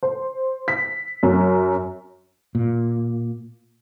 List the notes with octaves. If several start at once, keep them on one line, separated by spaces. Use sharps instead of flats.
C5
B6
F#2
A#2